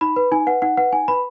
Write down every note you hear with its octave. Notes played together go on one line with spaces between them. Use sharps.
D#4 B5
B4
D#4 G#5
B4 F#5
D#4 F#5
B4 F#5
D#4 G#5
B4 B5